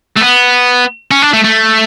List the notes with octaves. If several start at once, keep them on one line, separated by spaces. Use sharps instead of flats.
A3
B3
C#4
D4
A3
A3